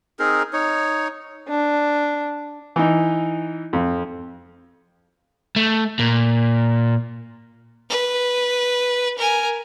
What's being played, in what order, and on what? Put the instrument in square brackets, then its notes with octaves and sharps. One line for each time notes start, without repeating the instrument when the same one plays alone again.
[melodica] C4 D#4 G#4 A#4
D#4 C#5
[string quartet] D4
[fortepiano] E3 D#4
F2
[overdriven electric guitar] A3
A#2
[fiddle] B4
A#4 G#5